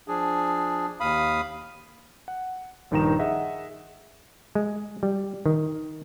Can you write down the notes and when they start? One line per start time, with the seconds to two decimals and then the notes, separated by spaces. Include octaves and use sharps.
0.08 F3 D4 G#4
1.00 D#2 F5 B5 D#6
2.28 F#5
2.91 A#1 G2 D#3 D#4 A#5 E7
3.19 G#4 D#5 E5 F#5
4.55 G#3
5.03 G3
5.46 D#3